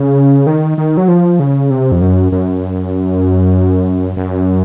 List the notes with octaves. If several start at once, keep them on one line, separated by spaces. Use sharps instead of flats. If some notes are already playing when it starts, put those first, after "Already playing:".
Already playing: C#3
D#3
D#3
F#3
F3
C#3
C3
F2
F#2
F#2
F#2